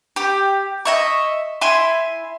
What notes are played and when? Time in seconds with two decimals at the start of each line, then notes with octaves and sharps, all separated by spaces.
0.16 G4
0.85 D#5 E5 C#6
1.61 E4 E5 G#5 C6